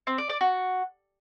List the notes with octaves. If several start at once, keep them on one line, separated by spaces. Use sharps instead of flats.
C4
D5
D5
F#4